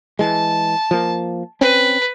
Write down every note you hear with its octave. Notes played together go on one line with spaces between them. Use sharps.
E3 G#3 A5
F3 A#3
C4 C#4 B4